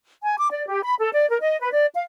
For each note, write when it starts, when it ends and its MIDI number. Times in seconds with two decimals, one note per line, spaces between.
0.23 0.37 80
0.38 0.49 86
0.51 0.65 74
0.68 0.80 67
0.82 0.93 83
0.99 1.09 69
1.12 1.29 74
1.29 1.38 70
1.41 1.59 75
1.60 1.72 71
1.73 1.85 74
1.93 2.01 77